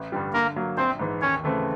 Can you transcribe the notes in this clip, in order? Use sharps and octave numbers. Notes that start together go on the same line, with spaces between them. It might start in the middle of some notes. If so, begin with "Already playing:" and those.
Already playing: A1
G2 D3 G3
D3 A#3 A#4
F#3 A#3
A#1 C4 C5
G#2 E3
D#2 C#4 C#5
C#3 E3 A3 C4